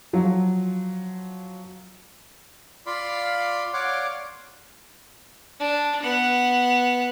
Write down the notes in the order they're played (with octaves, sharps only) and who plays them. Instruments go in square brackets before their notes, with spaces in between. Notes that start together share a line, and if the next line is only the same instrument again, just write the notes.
[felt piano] F3 F#3
[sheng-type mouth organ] F4 D5 F5 B5 C6
C#5 D5 F5 F#5 C6 D6
[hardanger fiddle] D4
B3 F#5